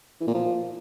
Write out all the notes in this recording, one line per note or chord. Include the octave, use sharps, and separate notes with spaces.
E3
A#2
F3